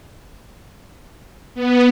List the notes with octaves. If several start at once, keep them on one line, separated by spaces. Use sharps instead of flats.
B3